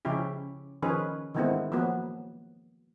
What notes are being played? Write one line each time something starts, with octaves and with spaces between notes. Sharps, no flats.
C#3 F3 C#4 E4 G4
D#3 F3 C#4 G#4 B4
D#3 E3 G#3 A3 B3 C4
F3 F#3 A#3 B3